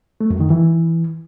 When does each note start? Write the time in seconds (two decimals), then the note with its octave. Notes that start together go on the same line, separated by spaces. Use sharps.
0.21 A3
0.30 F#2
0.40 D#3
0.50 E3